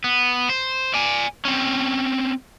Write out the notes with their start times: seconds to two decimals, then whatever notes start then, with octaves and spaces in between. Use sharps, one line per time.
0.04 B3
0.49 C5
0.94 D5 G#5
1.45 C4 C#4